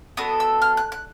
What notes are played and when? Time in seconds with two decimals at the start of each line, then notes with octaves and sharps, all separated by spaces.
0.17 B3 D4 F#4 A4 D#6
0.40 E6
0.62 F6
0.77 F#6
0.92 F#6